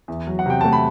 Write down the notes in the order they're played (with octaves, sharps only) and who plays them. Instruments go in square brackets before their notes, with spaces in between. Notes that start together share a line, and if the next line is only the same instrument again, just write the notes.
[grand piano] E2
F#3
F#5
C3 G5
A3 A5
B5